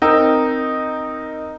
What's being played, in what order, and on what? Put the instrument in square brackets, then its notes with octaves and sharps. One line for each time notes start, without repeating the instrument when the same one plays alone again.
[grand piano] C4 D#4 A#4 G5 E6